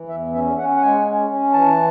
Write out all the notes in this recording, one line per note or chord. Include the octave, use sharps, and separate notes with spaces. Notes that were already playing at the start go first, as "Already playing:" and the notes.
Already playing: E3
E2 E5
C#4 E5
C#4 F#5
F#5
G#3 G#5
C#4
C#4
E3 A5